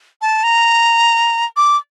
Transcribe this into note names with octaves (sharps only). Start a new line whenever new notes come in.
A5
A#5
D6